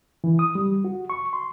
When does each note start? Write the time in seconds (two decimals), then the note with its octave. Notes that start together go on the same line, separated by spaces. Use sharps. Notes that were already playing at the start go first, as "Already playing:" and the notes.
0.24 E3
0.39 D#6
0.55 G3
0.85 F#4
1.10 C#6
1.33 C6